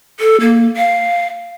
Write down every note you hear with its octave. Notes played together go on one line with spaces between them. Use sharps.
A4
A#3
F5